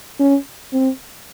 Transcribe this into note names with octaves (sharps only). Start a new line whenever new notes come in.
C#4
C4